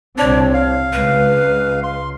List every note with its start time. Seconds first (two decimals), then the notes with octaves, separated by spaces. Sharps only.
0.18 C2 C4 D4 C#5
0.54 F5
0.93 C#2 B4
1.84 C6